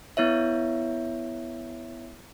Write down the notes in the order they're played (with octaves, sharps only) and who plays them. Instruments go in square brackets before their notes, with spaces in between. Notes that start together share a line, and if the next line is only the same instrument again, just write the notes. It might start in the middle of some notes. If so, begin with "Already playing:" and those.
[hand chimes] B3 E4 C#5 E5